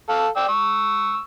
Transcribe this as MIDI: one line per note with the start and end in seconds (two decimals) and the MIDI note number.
0.09 0.27 69
0.09 0.27 77
0.36 0.48 74
0.36 0.48 79
0.36 0.48 88
0.48 1.20 85
0.48 1.20 88